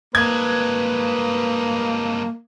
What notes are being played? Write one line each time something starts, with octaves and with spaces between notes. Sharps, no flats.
G2 G#3 A#3 B4 G#6